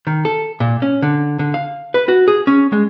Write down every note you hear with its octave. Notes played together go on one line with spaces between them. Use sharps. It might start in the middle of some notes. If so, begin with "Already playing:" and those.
D#3
A4
A#2
C#4
D3
D3
F5
B4
F#4
G#4
C#4
G#3